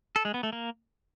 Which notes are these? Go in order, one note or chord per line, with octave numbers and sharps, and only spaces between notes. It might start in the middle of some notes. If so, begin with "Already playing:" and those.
A4
G#3
B3
A3
A#3